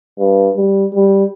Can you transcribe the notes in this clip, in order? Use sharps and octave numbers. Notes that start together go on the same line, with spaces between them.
G2
G3
G3